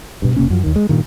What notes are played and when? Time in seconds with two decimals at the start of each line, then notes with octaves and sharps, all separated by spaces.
0.22 G2 B2
0.36 F1 C3 A#3 C#4
0.50 F#2 F3
0.63 D#2 D#3
0.76 G#3
0.89 G2 A#2 D#3